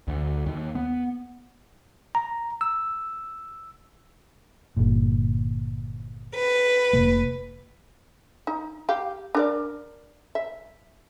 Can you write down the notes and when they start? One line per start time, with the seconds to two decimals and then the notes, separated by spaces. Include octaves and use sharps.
0.08 D2
0.46 D#2
0.75 B3
2.15 A#5
2.61 E6
4.77 G1 A#2
6.34 B4
6.93 F1 C3 A#3
8.47 D#4
8.89 G4 F5
9.35 D4 A#4 D5
10.35 E5